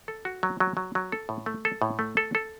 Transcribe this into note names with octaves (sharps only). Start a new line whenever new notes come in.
A4
F#4
F#3
F#3
F#3
F#3
A4
A2
A3
A4
A2
A3
A4
A4